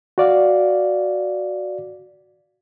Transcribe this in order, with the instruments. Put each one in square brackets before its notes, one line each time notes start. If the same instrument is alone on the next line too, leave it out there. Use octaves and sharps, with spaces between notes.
[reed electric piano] F#4 D5 F5